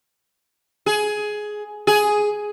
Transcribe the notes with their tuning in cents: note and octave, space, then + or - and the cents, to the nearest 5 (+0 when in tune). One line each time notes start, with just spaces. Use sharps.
G#4 +15
G#4 +5